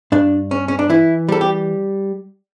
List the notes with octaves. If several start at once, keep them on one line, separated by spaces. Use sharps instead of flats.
G2 D4
C#4
C#4
D4
E3 E4
G3 A4
G4